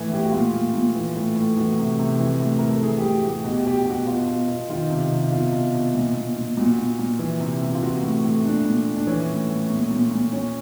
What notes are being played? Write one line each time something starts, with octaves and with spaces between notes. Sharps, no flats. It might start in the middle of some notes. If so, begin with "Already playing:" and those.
Already playing: A2 E3 E4
A2 G4
F#4
A#2 F4
A#2
A#2
E3
A2
A2
E3 F#4
C3
C3
E3
A2
A2 A#4
A4
E3 G#4
A2 G4
F#4
A2
G4
B2 F#4
G4
F#4
B2 G4
F#4
G4
B2 F#4
B2 F4
B2
B2
D#3 F4
C3
C3
B2 F4
B2
B2
A#2
A#2
A#2
A#2 F#4
A#2
A#2
E3
C3
C3
F4
E3 F#4
A2
A2
A#2 D4
A#2
A#2
D4
E3 C#4
A2
A2
A#2
A#2
A#2
A#2 C#4